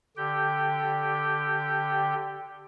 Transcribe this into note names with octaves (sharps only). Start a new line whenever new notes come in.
D3 G4 G5